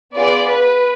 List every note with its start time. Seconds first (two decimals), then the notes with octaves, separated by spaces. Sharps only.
0.15 B3 F4 G#4 D5
0.48 B4